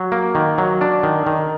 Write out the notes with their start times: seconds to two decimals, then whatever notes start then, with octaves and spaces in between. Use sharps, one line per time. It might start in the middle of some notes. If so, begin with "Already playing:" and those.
Already playing: F#3
0.12 A#3
0.35 D#3
0.58 F#3
0.81 D4
1.03 D#3
1.26 D#3